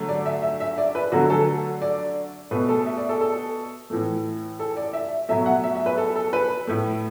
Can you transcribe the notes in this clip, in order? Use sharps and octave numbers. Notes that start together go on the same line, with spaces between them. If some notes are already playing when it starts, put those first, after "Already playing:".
Already playing: D3 F#3 A3
D5
E5
E5
E5
D5
B4
D3 F#3 A3 F#4
A4
D5
B2 A3 B4
A4
E5
D5
A4
A4
A2 E3 A3
A4
D5
E5
B2 F#3 A3 E5
F#5
E5
E5
B4
A4
A4
B4
A2 A3